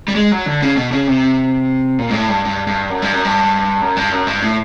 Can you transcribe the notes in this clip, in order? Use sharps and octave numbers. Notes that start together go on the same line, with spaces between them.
G3
G#3
F#3
D3
C#3
B2
C#3
C3
A#2
G#2
A2
G2
G2
G2
F#2
G2
F#2
G2
F#2
G2
F#2
G2
A2